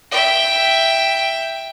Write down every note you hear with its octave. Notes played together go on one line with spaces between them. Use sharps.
E5 G5